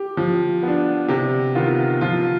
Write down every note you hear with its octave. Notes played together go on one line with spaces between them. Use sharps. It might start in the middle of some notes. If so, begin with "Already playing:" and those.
Already playing: G4
F3
B3
D4
C3 G4
D#3 B3 F4
F3 F4